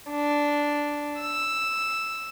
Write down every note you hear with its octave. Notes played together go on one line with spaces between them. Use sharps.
D4
E6